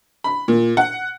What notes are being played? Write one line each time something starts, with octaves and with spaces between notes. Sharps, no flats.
B5
A#2
F#5